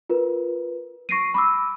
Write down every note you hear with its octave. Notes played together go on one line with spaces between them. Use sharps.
F4 A#4 B4
C#6 A#6 C7 D7 D#7
B5 D6 E6